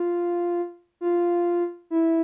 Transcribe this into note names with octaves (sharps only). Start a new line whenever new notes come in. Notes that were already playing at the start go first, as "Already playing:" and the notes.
Already playing: F4
F4
E4